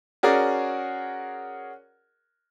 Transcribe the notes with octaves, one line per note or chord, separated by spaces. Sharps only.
C#4 F#4 G#4 A#4 D5